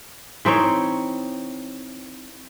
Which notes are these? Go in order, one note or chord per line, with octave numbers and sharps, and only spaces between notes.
E3 C4 D#4 C#5